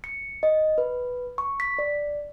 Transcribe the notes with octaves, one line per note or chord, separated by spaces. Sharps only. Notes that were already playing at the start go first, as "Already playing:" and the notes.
C#7
D#5
B4
C#6
B6
D5